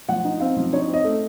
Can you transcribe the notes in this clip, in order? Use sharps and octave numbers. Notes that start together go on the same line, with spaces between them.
F3 F#5
D#4
C4 F5
F3
D#4 C#5
C4
D#5
A3